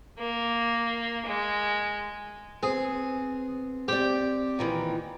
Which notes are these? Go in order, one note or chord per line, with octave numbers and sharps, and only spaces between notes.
A#3
G#3
B3 C4 G#4
C4 G4 D5
A#2 D#3 E3